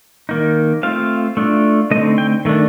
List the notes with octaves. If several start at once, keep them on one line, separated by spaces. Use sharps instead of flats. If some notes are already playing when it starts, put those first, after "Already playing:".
D#3 A#3 D#4
A3 C4 F4 F5
A3 D4 F4
D3 A3 C4 D#4 D#5
G5
D#3 A3 D4